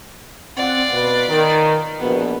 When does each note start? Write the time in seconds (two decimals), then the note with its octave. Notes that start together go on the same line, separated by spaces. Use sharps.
0.57 C4 F4 D5 F#5
0.92 B2 B4
1.28 D#3
1.99 A#1 E2 B2 B3